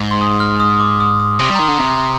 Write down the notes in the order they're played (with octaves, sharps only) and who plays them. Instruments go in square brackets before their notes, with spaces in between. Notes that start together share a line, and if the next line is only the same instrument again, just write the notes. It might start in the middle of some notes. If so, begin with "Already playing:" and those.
Already playing: [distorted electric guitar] G#2
[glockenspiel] C6
D#6
F6
D#6
D6
D#6
D#6
[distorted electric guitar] C3 [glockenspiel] C6
[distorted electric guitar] G3
[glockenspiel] A#5
[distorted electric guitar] D#3 [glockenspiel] C6
[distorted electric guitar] D3
[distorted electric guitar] C3 [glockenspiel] A#5